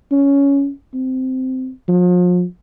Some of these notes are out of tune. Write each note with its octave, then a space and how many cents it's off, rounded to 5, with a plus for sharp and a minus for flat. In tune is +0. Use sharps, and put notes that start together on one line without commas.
C#4 +10
C4 -15
F3 +40